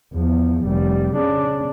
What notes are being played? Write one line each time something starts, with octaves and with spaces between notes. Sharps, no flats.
E2 F3
F1 G3
C#3 D4